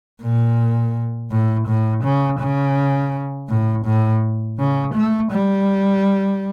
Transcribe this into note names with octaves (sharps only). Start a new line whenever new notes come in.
A#2
A2
A2
C#3
C#3
A2
A2
C#3
A3
G3